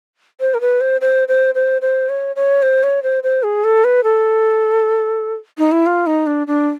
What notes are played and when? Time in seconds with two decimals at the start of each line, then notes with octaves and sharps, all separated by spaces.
0.40 C5
0.54 A#4
0.61 B4
0.81 C5
1.01 C5
1.28 C5
1.55 C5
1.82 C5
2.09 C#5
2.36 C#5
2.62 C5
2.83 C#5
3.03 C5
3.23 C5
3.43 G#4
3.64 A4
3.84 B4
4.04 A4
5.58 D#4
5.72 E4
5.86 F4
6.06 D#4
6.27 D4
6.47 D4